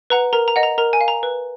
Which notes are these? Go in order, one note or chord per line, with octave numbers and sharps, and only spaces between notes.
B4 F#5 A#5
A#4 A#5
A#5
D#5 F#5
A#5
A#4 A#5
G#5
F5
A#5
B4